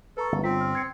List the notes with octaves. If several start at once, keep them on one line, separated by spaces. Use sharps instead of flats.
A4 B4 A#5 C#6
G1
C4 F4 B6
F6
G#6 C7 C#7